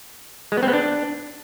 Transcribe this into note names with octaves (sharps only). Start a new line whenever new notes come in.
G#3
B3
C4
B3
D4